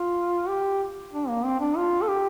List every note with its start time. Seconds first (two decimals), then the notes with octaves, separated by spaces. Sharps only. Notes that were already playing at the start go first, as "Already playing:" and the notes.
Already playing: F4
0.48 G4
1.13 D4
1.29 A#3
1.45 C4
1.60 D4
1.77 F4
2.02 A4
2.08 G4